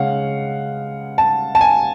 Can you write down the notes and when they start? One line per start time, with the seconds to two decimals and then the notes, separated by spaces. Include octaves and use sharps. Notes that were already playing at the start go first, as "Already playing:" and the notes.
Already playing: C#3 G#3 C#4 F5 F#5
1.18 A5
1.55 A5
1.61 G#5